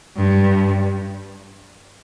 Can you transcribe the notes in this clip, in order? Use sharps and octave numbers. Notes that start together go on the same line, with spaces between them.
G2